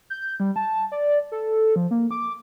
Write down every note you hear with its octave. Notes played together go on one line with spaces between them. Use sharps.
G6
G3
A5
D5
A4
F3
A#3
D6